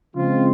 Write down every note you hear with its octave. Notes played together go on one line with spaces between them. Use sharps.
C#3 F3 G#3 C4 F4